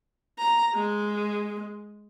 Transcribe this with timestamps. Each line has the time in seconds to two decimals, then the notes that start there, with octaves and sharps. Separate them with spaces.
0.39 A#5
0.75 G#3